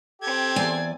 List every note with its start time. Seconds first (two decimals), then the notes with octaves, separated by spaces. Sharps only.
0.22 C4 G4 A4 G#6
0.56 E2 D5 G#5